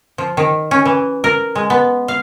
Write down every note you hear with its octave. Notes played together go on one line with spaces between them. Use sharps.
F3
D#3
C#4
E3
A#4
G#3
B3
F5